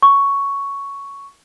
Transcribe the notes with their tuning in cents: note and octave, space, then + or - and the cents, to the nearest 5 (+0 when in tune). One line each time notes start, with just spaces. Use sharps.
C#6 +5